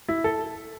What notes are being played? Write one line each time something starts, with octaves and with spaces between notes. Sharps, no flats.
E4
A4